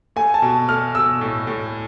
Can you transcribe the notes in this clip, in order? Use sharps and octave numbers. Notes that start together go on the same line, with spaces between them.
A3 G#5
A5
B2
A3 F6
B2 E6
A2
A2